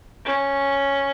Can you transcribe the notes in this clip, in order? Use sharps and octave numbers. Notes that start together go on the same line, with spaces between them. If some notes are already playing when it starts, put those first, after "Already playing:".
C#4